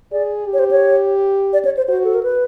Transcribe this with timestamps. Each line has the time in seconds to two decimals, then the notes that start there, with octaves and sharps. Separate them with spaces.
0.12 G#4 D5
0.47 G4
0.53 C#5
0.59 C5
0.71 C#5
1.53 D5
1.65 C#5
1.77 C5
1.88 F#4 C5
2.04 A4
2.14 A#4
2.23 B4